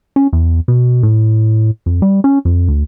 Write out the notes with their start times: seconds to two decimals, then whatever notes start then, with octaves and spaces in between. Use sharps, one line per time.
0.16 C#4
0.33 E2
0.68 B2
1.03 A2
1.86 F2
2.02 G3
2.24 C#4
2.45 F2
2.68 D2